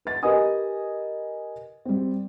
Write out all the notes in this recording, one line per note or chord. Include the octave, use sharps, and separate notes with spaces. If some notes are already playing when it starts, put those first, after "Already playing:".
B4 A6
G4 A#4 B4 D#5 G#5 D#6
G3 C4